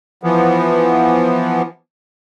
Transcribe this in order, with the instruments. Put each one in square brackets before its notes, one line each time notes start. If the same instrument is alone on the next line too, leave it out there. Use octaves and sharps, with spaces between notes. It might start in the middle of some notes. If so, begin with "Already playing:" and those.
[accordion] E3 F3 B3